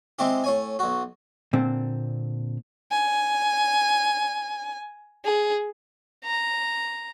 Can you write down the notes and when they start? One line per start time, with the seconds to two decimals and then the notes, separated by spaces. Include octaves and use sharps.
0.19 G#3 C4 E4 G4
0.44 A2 C#5 G#5
0.79 B1 F#4
1.53 A#2 D3 C4
2.92 G#5
5.25 G#4
6.25 A#5